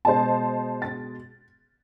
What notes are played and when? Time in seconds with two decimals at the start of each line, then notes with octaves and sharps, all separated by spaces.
0.05 B2 G#3 C5 D#5 A5
0.82 A6